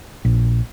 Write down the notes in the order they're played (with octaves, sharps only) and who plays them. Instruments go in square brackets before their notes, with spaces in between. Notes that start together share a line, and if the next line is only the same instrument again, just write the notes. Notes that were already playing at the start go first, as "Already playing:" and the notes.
[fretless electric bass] A#1